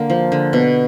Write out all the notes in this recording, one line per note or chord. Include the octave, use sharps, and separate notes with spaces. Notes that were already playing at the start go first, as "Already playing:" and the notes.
Already playing: D3 A#3
F3
D3
B2